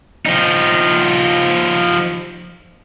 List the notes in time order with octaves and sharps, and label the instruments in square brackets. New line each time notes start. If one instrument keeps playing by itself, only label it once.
[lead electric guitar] F3 D#4